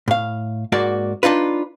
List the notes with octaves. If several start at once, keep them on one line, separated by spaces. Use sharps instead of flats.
A2 F5
G#2 A#3 F#4 D5
D4 D#4 F4 B4